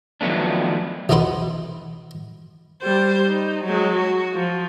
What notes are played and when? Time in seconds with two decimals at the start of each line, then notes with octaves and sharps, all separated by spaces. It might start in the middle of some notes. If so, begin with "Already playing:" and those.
0.21 D#3 F3 F#3 A3 B3 D4
1.09 B1 E2 B2 D#4 B4 C5
2.82 G3 C5
3.27 D#4
3.65 F#3 G#3
3.97 F#4
4.34 F3